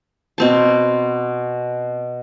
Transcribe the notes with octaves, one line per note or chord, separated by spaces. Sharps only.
B2 C4 A5